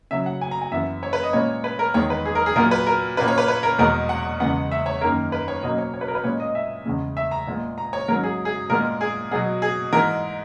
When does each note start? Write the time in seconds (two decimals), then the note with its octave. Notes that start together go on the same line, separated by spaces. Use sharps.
0.11 C#3 F#3 C#4 E5
0.26 F#5
0.41 G#5
0.51 A#5
0.61 G#5
0.72 F#2 E3 B3 E5
1.03 C#5
1.13 B4
1.23 D#5
1.33 A#2 G#3 C#4 C#5
1.64 B4
1.79 A#4
1.94 E2 D#3 G#3 B3 C#5
2.10 B4
2.25 G#4
2.35 A#4
2.46 G#4
2.56 A#2 F#3 B3 A#4
2.71 B4
2.87 A#4
3.17 A#2 A#3 C#4 B4
3.28 C#5
3.38 B4
3.48 B4
3.63 A#4
3.79 E2 B2 G#3 B3 A#4
4.09 F#5
4.40 E2 C#3 G#3 B3 F#5
4.71 E5
4.86 C#5
5.01 F#2 D#3 A#3 A#4
5.32 B4
5.48 C#5
5.63 B2 F#3 A#3 C#4 D#5
5.78 C#5
5.94 C#5
6.01 B4
6.08 A#4
6.15 B4
6.24 A#2 G#3 C#4 C#5
6.40 D#5
6.55 E5
6.86 E2 C#3 G#3
7.17 E5
7.31 A#5
7.47 A#2 G#3 B3
7.78 A#5
7.93 C#5
8.08 G#2 F#3 C#4 A#4
8.24 G#4
8.45 G#4
8.70 A#2 G#3 B3 A#4
9.01 G#4
9.31 B2 F#3 B3 G#4
9.62 G#4
9.93 G#2 E3 G#3 A#4